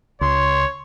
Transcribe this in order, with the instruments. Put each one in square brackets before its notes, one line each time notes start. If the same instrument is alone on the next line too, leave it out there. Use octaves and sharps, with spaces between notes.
[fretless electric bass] C#2 [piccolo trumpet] C#5 [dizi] C6